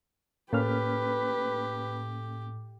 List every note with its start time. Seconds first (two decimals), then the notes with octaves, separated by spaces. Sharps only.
0.53 A2 A#3 C#4 G4 B4 F6